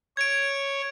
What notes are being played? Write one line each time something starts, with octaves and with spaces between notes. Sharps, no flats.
C#5 G#6 D7